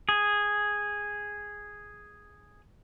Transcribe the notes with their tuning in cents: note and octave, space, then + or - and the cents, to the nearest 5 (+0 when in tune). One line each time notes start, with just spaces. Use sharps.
G#4 -5